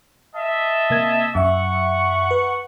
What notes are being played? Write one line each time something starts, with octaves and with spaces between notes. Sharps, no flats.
D#5 E5 A5
C3 A#3 G#6
F#2 E5 F#5 C#6
B4